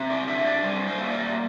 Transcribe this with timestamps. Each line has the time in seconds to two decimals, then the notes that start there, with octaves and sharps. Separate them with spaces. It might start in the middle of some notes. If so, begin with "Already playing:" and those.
Already playing: C3
0.10 D5
0.27 D4 E5
0.45 D5
0.63 G3 C5
0.87 C5
0.98 A#3 E5
1.10 D5